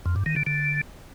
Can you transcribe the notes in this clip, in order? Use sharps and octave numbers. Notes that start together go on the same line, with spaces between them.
F2
G2
D#3
D3
D3